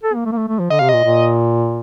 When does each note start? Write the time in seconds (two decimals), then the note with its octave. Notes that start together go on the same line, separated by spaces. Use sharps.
0.04 A4
0.15 A#3
0.26 A3
0.32 A#3
0.37 A3
0.48 A3
0.59 F3
0.70 D3 D#5
0.79 C3 F5
0.89 A#2 D#5
1.04 A#2